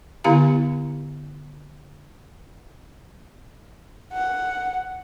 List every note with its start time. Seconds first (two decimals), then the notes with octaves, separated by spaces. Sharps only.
0.24 D3 B3 E4 G4 F5 A#5
4.13 F#5